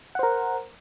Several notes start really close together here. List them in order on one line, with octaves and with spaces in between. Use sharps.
F#5 C5 A#4